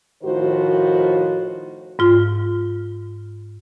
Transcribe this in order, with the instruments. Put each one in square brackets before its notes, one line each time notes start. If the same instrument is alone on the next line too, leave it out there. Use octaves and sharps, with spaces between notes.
[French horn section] A2 D#3 F3 F#4 A#4 C5
[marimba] G#2 F4